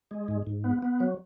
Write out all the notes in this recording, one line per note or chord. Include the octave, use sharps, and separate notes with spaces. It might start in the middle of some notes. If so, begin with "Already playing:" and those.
G#3
G#2
G#2
B3
B3
F#3